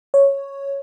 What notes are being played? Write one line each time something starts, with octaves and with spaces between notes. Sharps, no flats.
C#5